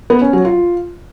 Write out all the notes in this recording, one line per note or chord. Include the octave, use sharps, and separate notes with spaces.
B3
C#4
F#3
F4